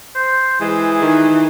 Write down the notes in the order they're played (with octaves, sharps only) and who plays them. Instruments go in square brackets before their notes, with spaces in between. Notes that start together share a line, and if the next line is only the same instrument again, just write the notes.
[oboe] C5
[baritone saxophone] E3 [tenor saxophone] G#3 [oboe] G#4
[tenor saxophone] D#3